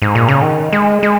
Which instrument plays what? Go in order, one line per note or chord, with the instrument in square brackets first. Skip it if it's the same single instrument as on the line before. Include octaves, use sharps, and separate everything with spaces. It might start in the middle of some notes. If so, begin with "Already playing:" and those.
[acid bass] G#2
A#2
C#3
D#3
G#3
G#3